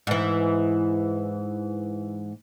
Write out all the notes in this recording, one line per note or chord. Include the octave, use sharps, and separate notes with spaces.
G#2 E3